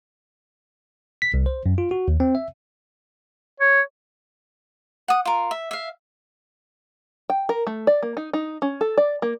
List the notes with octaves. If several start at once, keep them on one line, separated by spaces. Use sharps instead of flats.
B6
C2
C5
F#2
F4
F#4
D#2
C4
E5
C#5
F#5 D#6
F4 A#4
E5
E5 F5
G5
A#4
A3
D5
A#3
D#4
D#4
C#4
A4
D5
A#3